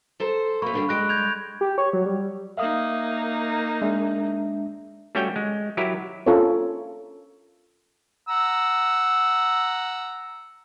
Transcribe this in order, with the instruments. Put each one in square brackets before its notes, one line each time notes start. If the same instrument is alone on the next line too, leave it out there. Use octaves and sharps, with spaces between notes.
[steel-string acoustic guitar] A4 C5 A#5
[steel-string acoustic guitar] A3 A#3 [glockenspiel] B5 C#6
[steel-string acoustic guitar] G2 D3 G3
[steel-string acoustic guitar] G3 G#3 [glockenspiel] F#6 A#6 D7
[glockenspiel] G6 G#6 F7
[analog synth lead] G4
C#5
F#3
G3
[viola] A#3 D#4 [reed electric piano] E5 F5 D#6
[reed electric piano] G#3 D4 E5
[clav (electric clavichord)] G3 A3 C#4 F#4 C#5 G5
G#3
F#3 E4 G4 A#4
[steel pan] C#4 F4 A4 A#4 C#5
[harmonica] F#5 A#5 E6